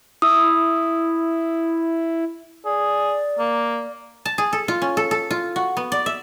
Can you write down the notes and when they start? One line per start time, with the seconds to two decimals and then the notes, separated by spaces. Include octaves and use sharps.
0.22 E4 D#6 E6
2.65 G#4 D5
3.39 A#3
4.25 A5
4.38 G#4
4.53 A4
4.68 F4
4.82 C#4
4.97 A4
5.11 A4
5.31 F4
5.56 F#4
5.77 B3
5.92 D5
6.06 E5